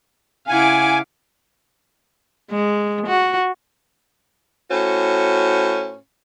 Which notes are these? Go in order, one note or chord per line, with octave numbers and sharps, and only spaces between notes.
C#3 E4 F5 F#5 G#5 D6
G#3
F#4
A2 C#4 F#4 C5